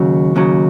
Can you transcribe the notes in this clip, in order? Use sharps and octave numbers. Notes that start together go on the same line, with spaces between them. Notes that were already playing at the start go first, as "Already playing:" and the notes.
Already playing: D#2 C#3 F#3
D#2 C#3 F#3